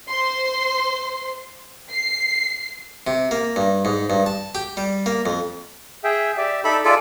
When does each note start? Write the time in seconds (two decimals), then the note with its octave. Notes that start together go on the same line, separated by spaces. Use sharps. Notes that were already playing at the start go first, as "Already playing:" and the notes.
0.11 C5 C6
1.91 C7
3.07 C3
3.31 A#3
3.56 G2
3.85 G#2
4.10 G2
4.26 A5
4.55 G4
4.77 G3
5.06 A#3
5.26 F2
6.04 G#4 E5 G5
6.38 G4 D5 E5
6.64 D#4 A4 D5 E5 B5
6.85 F4 G#4 A4 D5 E5